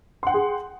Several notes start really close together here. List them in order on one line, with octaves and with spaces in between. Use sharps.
C6 F#5 G5 G#4